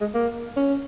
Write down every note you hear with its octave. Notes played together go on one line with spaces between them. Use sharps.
G#3
A#3
C#4